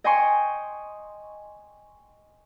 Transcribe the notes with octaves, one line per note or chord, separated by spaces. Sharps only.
D#5 G5 G#5 C6 C#6